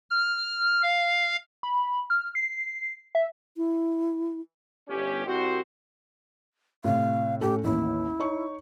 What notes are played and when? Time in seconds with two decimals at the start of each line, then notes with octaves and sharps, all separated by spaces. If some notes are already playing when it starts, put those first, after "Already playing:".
0.10 F6
0.83 F5
1.63 B5
2.10 F6
2.35 C7
3.15 E5
3.57 E4
4.89 G1 C#4 G4
5.26 C2 C4 F#4 C5
6.84 A2 C3 F5
7.41 A2 C#4 G4 A4
7.64 A1 D#2 E4
8.19 D#4 C#5 C#6